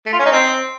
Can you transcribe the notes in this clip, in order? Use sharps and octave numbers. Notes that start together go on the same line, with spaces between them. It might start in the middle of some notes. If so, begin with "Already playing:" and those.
A3
F4
C#4
D#4
C4